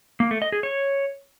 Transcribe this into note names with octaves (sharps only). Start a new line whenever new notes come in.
A#3
A3
D#5
G#4
C#5